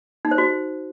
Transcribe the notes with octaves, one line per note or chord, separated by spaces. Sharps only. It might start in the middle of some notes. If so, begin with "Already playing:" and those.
D#4
C5
F#4